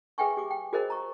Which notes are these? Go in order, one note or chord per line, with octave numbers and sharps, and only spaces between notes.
G#4 B4 E5 G5 G#5 C#6
G4 G#4 C#6 D6
G5
F#4 G#4 A#4 C5 D#5
A#5 C#6